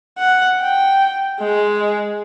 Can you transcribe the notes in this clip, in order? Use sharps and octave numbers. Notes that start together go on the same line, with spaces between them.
F#5
G5
G#3